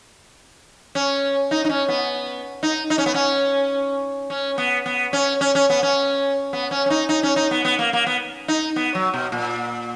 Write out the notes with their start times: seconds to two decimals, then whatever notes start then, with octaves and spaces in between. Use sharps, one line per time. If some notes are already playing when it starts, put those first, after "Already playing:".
0.95 C#4
1.51 D#4
1.65 D#4
1.70 C#4
1.89 B3
2.63 D#4
2.90 D#4
2.98 C#4
3.06 B3
3.14 C#4
4.30 C#4
4.58 B3
4.86 B3
5.13 C#4
5.41 C#4
5.55 C#4
5.70 B3
5.83 C#4
6.53 B3
6.71 C#4
6.86 C#4
6.90 D#4
7.09 D#4
7.23 C#4
7.36 D#4
7.51 B3
7.65 B3
7.79 A#3
7.93 A#3
8.07 B3
8.48 D#4
8.76 B3
8.95 F#3
9.14 B2
9.32 A#2